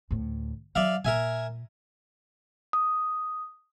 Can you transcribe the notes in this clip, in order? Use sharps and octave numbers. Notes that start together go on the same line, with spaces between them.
D2 A2
F#3 E4 D5 E5 F5
A#2 A#4 E5 G#5
D#6